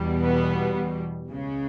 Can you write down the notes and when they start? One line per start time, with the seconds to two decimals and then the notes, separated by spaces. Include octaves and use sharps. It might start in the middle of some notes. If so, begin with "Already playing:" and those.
Already playing: E2 B2 G3
0.22 B3
1.31 C#2 C#3 G#3